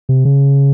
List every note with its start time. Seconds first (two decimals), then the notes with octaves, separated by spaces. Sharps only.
0.09 C3
0.25 C#3